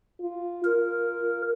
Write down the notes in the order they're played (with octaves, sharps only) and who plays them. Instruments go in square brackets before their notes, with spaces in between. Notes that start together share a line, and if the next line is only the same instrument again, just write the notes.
[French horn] F4
[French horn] F4 [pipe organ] A#4